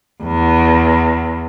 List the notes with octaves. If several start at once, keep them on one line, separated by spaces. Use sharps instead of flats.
E2